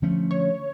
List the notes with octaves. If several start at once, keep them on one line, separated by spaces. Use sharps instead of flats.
D3 F3 A3 C#4
C#5